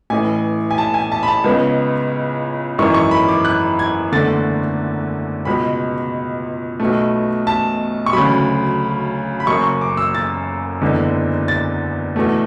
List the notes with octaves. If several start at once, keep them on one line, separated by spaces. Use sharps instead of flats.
A1 A2 E3 G#5
G#5
A5
G#5
A5
B5
A5
C#2 C#3 G#3 B3
G#1 F#2 E3 G#3 C#6
C#6
B5
D6
F#6
G#6
F#1 E2 D3 A3 A6
C#2 B2 G#3 B5
B1 B2 A3
A5
C#6
D2 C#3 F#3 B5
B5
F#1 F#2 C#3 C#6
C#6
D6
E6
A6
F#1 E2 D3 G#3
A6
E2 B2 A3